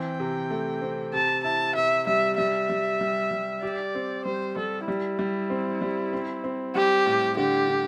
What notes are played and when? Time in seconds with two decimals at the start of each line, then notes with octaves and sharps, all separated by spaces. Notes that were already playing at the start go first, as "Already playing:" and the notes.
Already playing: E3 C4 G5
0.20 C3
0.51 A3
0.82 C4
1.13 C3 A5
1.44 E4 A5
1.75 C3 E5
2.07 G3 E5
2.38 G3 E5
2.69 G3
3.01 G3
3.31 G3
3.63 G4 D5
3.95 C4
4.25 G3 C5
4.56 G3 A4
4.87 G3 E4
5.19 G3
5.50 C4
5.81 G3
6.13 C4
6.44 C4
6.75 G3 G4
7.06 A2
7.37 D3 G4
7.69 D3